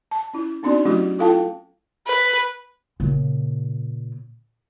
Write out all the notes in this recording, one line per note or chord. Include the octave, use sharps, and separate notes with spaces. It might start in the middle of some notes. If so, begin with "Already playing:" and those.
A5
C#4 E4
B3 C4 D4 D#4 F#4 D5
F#3 A3 C#4 E4 F#4 G4
E4 F4 A4 F5 G5 A5
B4
A#2 C#3